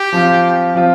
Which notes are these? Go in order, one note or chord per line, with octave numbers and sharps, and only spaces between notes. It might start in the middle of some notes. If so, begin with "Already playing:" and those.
Already playing: G4
F3 C4 F4
F3 C4 F4